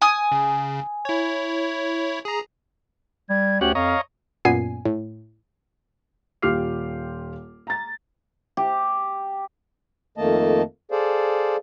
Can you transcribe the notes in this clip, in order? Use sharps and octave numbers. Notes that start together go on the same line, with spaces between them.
G#5 D#6
C#3
E4 C#5
G#4 A#5
G3 G#6
D2 C#4 F#4 G4 F#7
F2 C#5 D#5 F5 A#5
F#2 A#2 B3 G#5 C7
A2
D#1 F4 G4 D6 F6 C7
A#5 A6
G4
F2 D#3 A3 A#3 D#5 A5
G#4 A4 C5 D5 F5